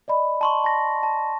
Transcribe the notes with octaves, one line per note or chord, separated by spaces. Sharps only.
D5 D#5 B5
A5 C6 C#6
A5 A#6
A5